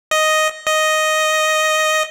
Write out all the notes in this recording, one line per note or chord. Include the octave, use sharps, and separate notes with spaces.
D#5
D#5